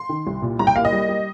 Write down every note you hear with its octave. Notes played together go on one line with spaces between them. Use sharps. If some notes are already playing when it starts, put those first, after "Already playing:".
Already playing: C6
D#3
C2
A#2
C2 A#5
G5
A#3 F5
D#5
G3
G3